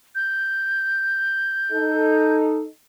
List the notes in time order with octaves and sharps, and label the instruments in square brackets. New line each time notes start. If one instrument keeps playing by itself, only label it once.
[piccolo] G6
[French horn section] D#4 A4